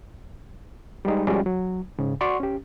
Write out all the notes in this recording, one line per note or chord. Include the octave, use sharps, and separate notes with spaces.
G3 G#3 D#4
F3 G3 G#3 C#4 F4 F#4
F#3
G#2 C#3
F#4 D5 F#5 C6 C#6
C#4 G4